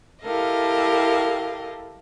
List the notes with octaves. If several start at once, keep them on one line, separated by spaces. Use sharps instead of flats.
E4 G4 A4 A#4 D#5 F5